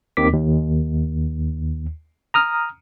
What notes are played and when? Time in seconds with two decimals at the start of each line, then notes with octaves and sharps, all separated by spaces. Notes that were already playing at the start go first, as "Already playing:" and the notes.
0.17 D#2 D#3 C4 D6 B6
0.32 D#2
2.34 A#5 D#6 F6